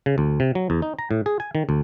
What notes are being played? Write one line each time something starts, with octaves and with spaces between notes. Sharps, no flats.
C#3
D2
C3
F#3
E2
D#4
A#5
A2
G#4
G#5
D#3
D2